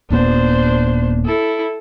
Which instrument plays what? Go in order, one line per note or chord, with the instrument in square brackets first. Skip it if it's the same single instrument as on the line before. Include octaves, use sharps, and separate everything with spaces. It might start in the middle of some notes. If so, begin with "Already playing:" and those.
[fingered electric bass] D#1 A#2 B3 [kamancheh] D4 C5
[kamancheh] E4 A4